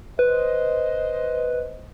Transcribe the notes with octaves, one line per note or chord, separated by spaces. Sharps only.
B4 C5 D#5